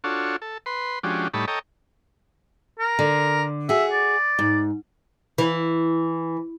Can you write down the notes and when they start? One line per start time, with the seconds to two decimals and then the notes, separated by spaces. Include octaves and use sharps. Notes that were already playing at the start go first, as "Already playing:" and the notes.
0.04 D4 F4 F#4 A4 C#5
0.42 A4
0.66 B4 C6
1.03 F3 G#3 C#4 D4 F#4 G4
1.34 A2 G3 D#4 C#5 A5 B5
1.48 A4 C#5 D#5 G5 A#5
2.79 A#4
2.99 D3
3.69 F#4 G#4 E5
3.92 D5
4.39 G#2
5.38 E3